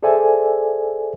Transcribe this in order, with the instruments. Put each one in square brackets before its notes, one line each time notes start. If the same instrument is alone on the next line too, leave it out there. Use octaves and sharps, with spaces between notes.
[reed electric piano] G#4 A4 C5 D5 E5 G#5